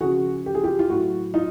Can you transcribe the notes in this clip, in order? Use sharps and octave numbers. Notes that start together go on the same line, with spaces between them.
C#3 F3 F#4 G#4
G4
G#4
F4 G4
F4
A2 F#3 E4 F#4
D#4 F4